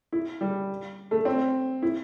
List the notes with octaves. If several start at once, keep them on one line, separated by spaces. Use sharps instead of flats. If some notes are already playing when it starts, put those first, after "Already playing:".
E4
G3
A3
C4
E4